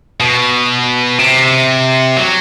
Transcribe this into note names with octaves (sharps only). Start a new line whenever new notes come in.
B2
C3
F#3